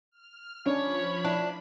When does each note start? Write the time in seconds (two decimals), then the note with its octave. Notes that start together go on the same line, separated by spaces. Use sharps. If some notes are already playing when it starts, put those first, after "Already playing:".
0.11 F6
0.66 F3 C#4 D4 C#5 B5
1.25 D4 E4